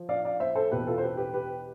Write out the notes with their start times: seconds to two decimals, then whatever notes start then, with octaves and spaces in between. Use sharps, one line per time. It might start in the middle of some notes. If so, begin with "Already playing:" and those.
Already playing: F3
0.09 D5 F5
0.25 D5 F5
0.40 C5 E5
0.55 A4 C5
0.71 E2 B2 G4 B4
0.87 F4 A4
0.98 C5
1.03 G4 B4
1.18 G4 B4
1.34 G4 B4